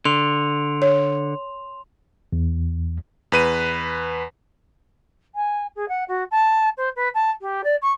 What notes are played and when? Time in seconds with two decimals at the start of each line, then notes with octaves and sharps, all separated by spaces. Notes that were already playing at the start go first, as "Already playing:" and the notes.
0.05 D3 C6 F7
0.82 C#5
2.33 E2
3.32 E2 B4 D#7
5.35 G#5
5.75 G#4
5.88 F#5
6.08 F#4
6.31 A5
6.77 C5
6.96 B4
7.14 A5
7.41 G4
7.64 D5
7.82 C#6